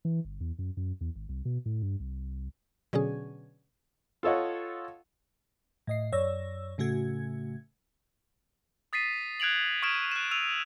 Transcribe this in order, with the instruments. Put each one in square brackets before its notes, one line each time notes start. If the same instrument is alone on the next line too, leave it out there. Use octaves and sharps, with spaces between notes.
[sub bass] E3
G1
E2
F#2
F#2
E2
G#1
C2
B2
A2
G2
C2
[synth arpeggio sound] B2 D3 F#3 C#4 G#4
[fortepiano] F4 A4 C#5 D#5 F#5
[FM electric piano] A2 D#5 C7
F#2 C#5 D5 E6 A#6
A2 C#3 A3 F#4 G#6
[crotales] D#6 A6 B6 C7 D#7
F#6 G#6 D7 F7 F#7
C#6 D#6 F6 G#6 D7 E7
F#6 E7
E6 D#7 F7